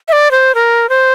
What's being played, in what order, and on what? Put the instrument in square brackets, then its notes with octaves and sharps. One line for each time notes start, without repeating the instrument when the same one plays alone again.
[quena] E5
D5
C5
A#4
C5